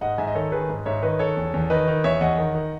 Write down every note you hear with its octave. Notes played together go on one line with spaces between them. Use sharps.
G#2 D#5 F#5
G#2 E5 G#5
D#5
D#3 A4 C#5
D#3 G#4 B4
G#2
G#2 C#5 E5
D#3 B4 D#5
D#3 A4 C#5
E2
E2
D#3 B4 D#5
D#3
E2 C#5 E5
E2 D#5 F#5
D#3
D#3